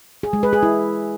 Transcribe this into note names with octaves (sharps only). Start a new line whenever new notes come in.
G#4
G#3
B4
G#4
E4